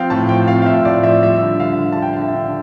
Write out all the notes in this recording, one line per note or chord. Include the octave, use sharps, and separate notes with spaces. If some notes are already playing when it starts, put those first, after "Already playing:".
Already playing: F3 C4 F5 G5
A2 A5
F3 G5
C4 F5
F5
A2 E5
A2 D5
F3 E5
G3 E5
D3
D3 F5
D3
A5
D3 G5
D3 F5
E5
D3